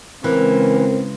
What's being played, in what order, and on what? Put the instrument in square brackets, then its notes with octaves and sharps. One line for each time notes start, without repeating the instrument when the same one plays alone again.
[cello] C#3 G#3 [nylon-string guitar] E3 [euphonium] C4 [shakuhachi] A#4